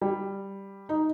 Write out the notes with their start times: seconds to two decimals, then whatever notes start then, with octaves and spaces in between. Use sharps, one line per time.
0.02 G3
0.89 D#4